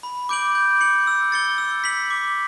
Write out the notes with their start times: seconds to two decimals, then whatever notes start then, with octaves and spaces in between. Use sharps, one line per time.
0.03 B5
0.29 D6 G6 D7 F#7
0.55 G6
0.81 C#7 F#7
1.07 E6
1.32 A6 C#7 G7
1.58 E6
1.84 B6 F#7
2.10 D6